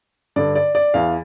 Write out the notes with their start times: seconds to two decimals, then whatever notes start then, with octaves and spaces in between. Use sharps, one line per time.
0.36 G2 D3 D5
0.55 D5
0.75 D5
0.94 E2 E3 F5